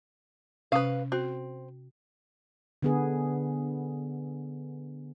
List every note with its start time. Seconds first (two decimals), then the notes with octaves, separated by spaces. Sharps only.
0.72 C3 C#4 B4 F5 D#6
1.12 C4 F#4
2.82 D3 B3 G#4